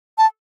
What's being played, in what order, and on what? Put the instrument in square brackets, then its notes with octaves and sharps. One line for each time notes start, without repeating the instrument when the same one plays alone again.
[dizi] A5